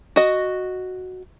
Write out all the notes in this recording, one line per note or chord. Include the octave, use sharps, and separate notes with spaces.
F#4 D#5